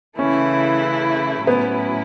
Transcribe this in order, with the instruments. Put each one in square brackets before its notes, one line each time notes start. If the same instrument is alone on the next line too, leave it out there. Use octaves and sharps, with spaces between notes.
[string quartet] C#3 E3 A3 E4 [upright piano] C#4
[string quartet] A2 F#3 C#4 E4 [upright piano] B3